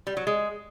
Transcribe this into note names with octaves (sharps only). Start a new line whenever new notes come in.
G3
F#3
G#3